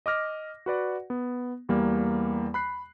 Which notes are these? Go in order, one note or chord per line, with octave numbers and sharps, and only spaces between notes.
D#5 D6 F6 A#6
F#4 B4 D5 F#5
B3
E2 G3 A#3
B5 F#6 C7